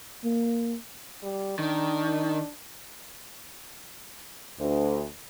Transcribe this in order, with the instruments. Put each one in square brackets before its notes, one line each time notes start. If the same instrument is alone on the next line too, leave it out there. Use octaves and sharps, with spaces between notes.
[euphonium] A#3
[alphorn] G3
[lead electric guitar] D#3 [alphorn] D4
[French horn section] D2